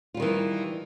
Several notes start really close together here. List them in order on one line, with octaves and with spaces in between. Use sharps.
F4 G3 D#3 E3